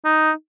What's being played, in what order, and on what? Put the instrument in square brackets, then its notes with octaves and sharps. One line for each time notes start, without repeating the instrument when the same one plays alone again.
[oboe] D#4